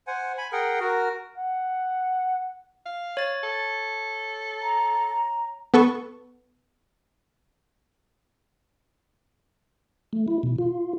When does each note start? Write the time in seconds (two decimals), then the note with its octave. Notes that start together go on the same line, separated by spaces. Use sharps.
0.07 C5 F#5 G#5
0.38 G#5 B5
0.52 G#4 A#4 F#5 G5
0.80 F#4 A#4
1.38 F#5
2.86 F5
3.17 C#5 A6
3.43 A4
4.62 A#5
5.74 B3 A4 C#6
10.13 A3
10.28 E4
10.43 B2
10.58 F4